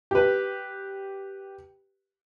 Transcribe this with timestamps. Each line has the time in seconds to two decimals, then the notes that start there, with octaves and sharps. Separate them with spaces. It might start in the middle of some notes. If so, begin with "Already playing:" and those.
0.11 G4 B4